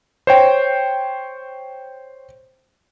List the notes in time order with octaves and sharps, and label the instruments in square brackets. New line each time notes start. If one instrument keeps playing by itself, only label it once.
[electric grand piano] C5 C#5 G5